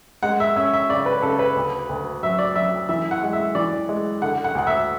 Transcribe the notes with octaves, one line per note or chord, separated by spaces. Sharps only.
G#3 F#5
E5
C#4 E5
E5
C#3 D5
B4
C#3 A4
B4
D2
D2
F#3 E5
D5
F#3 E5
E3 E5
F#5
G#3
E5
E3 D5
G#3
D3 F#5
F#5
D2 F#5
E5